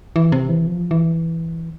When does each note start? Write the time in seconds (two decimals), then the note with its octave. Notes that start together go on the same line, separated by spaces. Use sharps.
0.16 E3
0.32 C3
0.49 E3
0.67 F3
0.91 E3